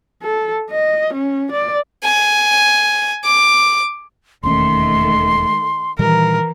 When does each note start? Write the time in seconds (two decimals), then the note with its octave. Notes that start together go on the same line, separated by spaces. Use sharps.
0.22 A4
0.70 D#5
1.14 C#4
1.52 D5
2.04 G#5
3.25 D6
4.43 E1 D#2 D#3 A3 C#4 C6
5.99 A#2 D#3 E3 G3 A#4